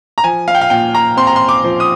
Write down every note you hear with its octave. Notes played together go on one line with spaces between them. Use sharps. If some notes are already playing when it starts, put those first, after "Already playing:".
A#5
F3 G#5
F5
G5
F5
A#2 G5
A#5
C4 C6
A#5
C6
D6
F3
D#6